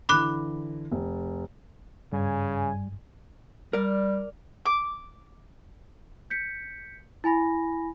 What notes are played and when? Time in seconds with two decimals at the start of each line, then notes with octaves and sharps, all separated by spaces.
0.09 D3 E3 B5 D6 F#6
0.91 F1
2.13 G2 C#3 G3 G#5
3.73 G3 A#4 D5
4.66 D6
6.30 G6 B6 C#7
7.24 E4 G#5 B5 A#6